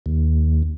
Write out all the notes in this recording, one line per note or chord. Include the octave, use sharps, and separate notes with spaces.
D#2